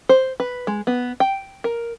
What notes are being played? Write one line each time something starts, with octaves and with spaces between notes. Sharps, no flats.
C5
B4
G#3
B3
G5
A#4